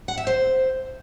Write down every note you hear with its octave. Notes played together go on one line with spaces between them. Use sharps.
F#5
E5
C5